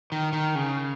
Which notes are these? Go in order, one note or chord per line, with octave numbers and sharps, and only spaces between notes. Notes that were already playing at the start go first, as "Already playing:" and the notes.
D#3
D#3
C#3